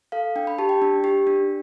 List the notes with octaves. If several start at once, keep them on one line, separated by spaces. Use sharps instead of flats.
A4 F5
D4 G5
B5
G4 A5
G5
D4
G4
D4